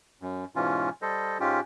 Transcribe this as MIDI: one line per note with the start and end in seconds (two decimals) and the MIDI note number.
0.22 0.45 42
0.56 0.90 44
0.56 0.90 47
0.56 0.90 52
0.56 0.90 61
0.56 0.90 65
1.02 1.38 55
1.02 1.38 69
1.02 1.38 72
1.02 1.38 75
1.40 1.60 44
1.40 1.60 56
1.40 1.60 61
1.40 1.60 65
1.40 1.60 67